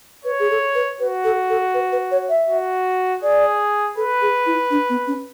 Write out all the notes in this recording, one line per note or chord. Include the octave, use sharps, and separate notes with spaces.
B4 C#5
G#4
A4
B4
F#4 B4
A4
A4
B4
B4
C#5
E5
F#4
G#4 D5
A4 B4
G#4
E4
D4
B3
C#4